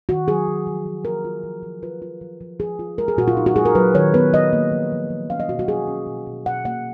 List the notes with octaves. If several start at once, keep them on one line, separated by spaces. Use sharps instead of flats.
D#3 F#4
F#3 G#4
D#3
F3
F3
F3 A#4
F4
F3
F3
F4 B4
F4
F3
F3
F3 G#4
F4
G#3 A#4
G#4
A#2 F#4
F4
D#4
F#4
G#3 G#4
A#4
F#3 B4
D#3 C#5
B3 B4
B3 D#5
A#3
F3
F3
F3
C#4 F5
D#5
B2 F#4
F#4
C#4 G#4
C#4
B2
B2
B2 F#5
A#3 F#5